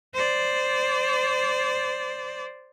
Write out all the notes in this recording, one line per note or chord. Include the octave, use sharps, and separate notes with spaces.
C5 D5